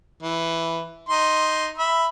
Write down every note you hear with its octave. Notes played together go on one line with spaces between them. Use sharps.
E3
D#4 C6
E5 B5